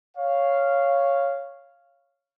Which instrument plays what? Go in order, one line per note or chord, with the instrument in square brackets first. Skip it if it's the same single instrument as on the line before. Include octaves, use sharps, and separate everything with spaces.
[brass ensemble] C#5 F5